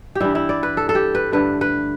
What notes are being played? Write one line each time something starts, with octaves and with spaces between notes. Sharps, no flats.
G4
G2 E3 G3 E4
E4
D5
B4
A4
A4
G4
B4
G2 D3 A3 B4
B4